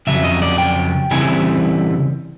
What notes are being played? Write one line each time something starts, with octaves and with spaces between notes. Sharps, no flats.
F2 C#3 F#3 E5
D#5
D5
G5
C#3 E3 G3 C4 E4 G#5